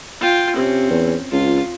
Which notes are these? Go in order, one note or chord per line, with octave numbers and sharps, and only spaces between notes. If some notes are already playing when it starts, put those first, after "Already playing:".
F4 G5
C3 C4 C#4
E2
C#2 F4